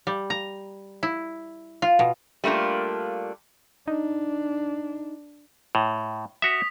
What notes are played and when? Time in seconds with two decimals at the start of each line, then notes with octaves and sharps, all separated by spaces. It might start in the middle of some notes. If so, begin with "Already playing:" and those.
0.07 G3
0.30 A#5
1.03 E4
1.82 F4
1.99 B2
2.44 G3 A3 A#3 D4 F4
3.88 D4 D#4
5.75 A2
6.42 F#4 E5 D#6 B6